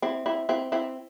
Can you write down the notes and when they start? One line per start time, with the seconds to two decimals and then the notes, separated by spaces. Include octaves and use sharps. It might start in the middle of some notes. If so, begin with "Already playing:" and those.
0.02 C4 E4
0.26 C4 E4
0.49 C4 E4
0.72 C4 E4